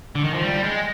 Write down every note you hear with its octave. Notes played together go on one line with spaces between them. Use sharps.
D3
D#3
F3
G3
G#3